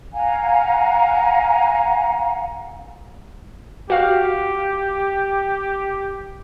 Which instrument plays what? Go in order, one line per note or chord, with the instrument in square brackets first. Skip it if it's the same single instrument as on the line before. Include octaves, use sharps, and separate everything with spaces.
[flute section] F5 F#5 G#5 A#5
[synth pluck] F#4 F5 [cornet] G4